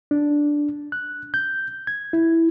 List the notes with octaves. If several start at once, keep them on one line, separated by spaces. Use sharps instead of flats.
D4
F#6
G6
G#6
E4